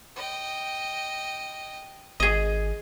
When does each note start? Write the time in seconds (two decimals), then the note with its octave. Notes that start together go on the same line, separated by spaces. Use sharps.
0.16 D#5 G5
2.20 G#1 G#4 D#5